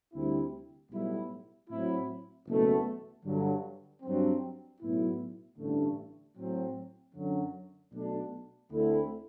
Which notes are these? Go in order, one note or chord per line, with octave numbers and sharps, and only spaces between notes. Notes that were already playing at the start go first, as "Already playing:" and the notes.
D2 C3 G3 C4 E4
B1 A2 G3 B3 E4
A2 F#3 C4 E4
F#1 E2 B2 A3
G2 D3 F#3
G2 F#3 C4
B1 A2 F#3 B3 E4
A1 G2 D3 A3
A2 F#3 C4
F#2 D3 F#3
B1 B2 A3 D4
D2 D3 A3 C4 E4